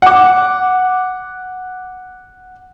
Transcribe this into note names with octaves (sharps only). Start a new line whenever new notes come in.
F#5 D6